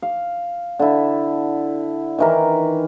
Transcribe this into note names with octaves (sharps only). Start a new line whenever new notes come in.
F5
D3 E4
D#3 E3 A#4